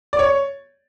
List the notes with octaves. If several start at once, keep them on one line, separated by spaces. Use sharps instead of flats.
D5
C#5